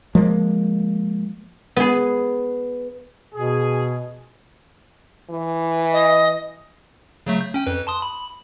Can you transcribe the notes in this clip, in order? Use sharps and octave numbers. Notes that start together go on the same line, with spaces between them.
F3 G#3 A#3
B3 G#4
B2 G#4
E3
D#5
C#3 F#3 A3
G6
C#4 G5
F2 B4
A5 C6 D#6
B5